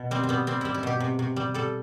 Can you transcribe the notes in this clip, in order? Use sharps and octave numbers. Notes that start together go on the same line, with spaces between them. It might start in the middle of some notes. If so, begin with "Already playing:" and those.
Already playing: B2
G3 C4
C4
G3 B3
G3 C4
G3 E4
E4
B2 G4
C3
C3
G3
G3 A4